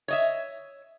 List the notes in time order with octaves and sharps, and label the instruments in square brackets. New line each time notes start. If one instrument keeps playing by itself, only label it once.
[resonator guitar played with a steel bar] C#5 D#5 E5